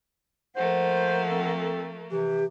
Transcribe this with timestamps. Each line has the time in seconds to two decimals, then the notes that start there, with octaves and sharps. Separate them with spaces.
0.56 F3 A3 A#3 C5 F#5
1.29 C4 A4
2.11 C3 E3 G4